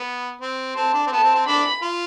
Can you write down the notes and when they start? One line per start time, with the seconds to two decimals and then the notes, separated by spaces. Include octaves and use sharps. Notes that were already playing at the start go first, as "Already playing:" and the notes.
Already playing: B3
0.41 C4
0.76 C4 A5
0.94 D4
1.07 C4
1.12 B3 A5
1.23 C4
1.35 C4
1.47 D4 B5
1.82 F4